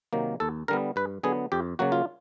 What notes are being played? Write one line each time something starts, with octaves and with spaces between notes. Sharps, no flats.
C3 D#3 F#3 A#3
D#2 A4
D3 G3 B3 A#4
G2 B4
D3 F#3 B3 G#4
F2 G4
C#3 F#3 A#3 F#4
F4